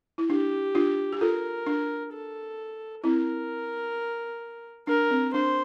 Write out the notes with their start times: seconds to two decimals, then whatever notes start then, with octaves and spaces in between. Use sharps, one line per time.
0.18 E4
0.29 D4 G4
0.75 D4 F4
1.13 G4
1.21 F4 A4 A#4
1.67 D4
2.12 A4
3.04 C4 E4 A#4
4.87 D4 A#4
5.11 C4
5.33 D4 C5